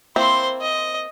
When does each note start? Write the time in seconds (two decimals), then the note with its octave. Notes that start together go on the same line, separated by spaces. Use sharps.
0.16 A#3 C4 E4 C5 C6
0.61 D#5